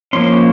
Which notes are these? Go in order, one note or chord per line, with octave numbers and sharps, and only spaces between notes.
F3 A#3 C#4 C6